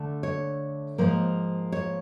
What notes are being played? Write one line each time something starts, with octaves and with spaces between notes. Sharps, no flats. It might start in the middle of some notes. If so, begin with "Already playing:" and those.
Already playing: D3 A3 D4
C#5
G#2 F3 A#3
C#5